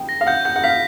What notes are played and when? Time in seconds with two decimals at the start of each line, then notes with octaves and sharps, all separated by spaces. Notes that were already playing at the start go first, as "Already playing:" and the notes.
Already playing: G5
0.09 A#6
0.21 F5
0.27 F#5 G6
0.45 F#5 G6
0.56 F#5
0.64 F5 B6